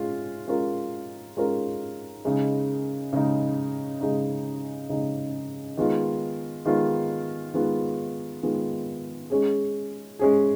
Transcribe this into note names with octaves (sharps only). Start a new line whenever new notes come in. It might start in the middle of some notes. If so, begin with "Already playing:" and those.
Already playing: G#3 C#4 F4
G#3 C#4 F4 A#4
G#3 C#4 F4 A#4
C#3 G#3 D#4
C#3 G#3 D#4
C#3 G#3 D#4
C#3 G#3 D#4
D#3 G#3 B3 F4
D#3 G#3 B3 F4
D#3 G#3 B3 F4
D#3 G#3 B3 F4
G#3 C#4 G#4
G#3 C#4 G#4